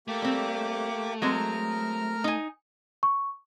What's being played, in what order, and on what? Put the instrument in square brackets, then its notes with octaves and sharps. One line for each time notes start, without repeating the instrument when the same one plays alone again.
[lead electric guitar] A3 [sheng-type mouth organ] A#3 G4 D6
[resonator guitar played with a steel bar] G3 C4
[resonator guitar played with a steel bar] F#3 G#3 C4 [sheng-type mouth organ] A#4 A#5 F6
[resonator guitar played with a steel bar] D#4 G#5
[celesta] C#6